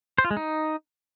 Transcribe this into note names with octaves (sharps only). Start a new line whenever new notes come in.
C5
F4
G#3
D#4